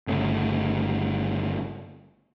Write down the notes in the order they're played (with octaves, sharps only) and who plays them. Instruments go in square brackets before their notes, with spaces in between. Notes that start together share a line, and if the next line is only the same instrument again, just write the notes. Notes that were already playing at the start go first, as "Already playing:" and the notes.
[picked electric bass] G1 C#3 A3